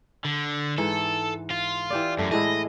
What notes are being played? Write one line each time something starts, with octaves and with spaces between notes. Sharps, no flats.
D3
G#2 E3 A4
F4
E3 G4 D5
F#2 A3
A2 G#3 E4 D#5